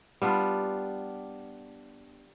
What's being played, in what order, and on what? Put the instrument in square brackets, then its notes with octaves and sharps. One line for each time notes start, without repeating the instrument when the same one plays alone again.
[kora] G3 B3 D4 F4